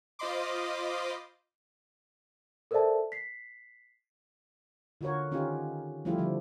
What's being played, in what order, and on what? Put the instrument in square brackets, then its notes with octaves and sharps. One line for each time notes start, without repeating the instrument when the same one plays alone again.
[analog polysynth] F4 C5 D#5 B5 C6 D6
[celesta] A4 A#4 C5 D5 E5 A5
B6 C7
[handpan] D3 F4 F#4 A#4 C#5
D#3 C#4 D#4 F4 G4
F3 G3 A3 E4 F4 G4
D3 F3 G3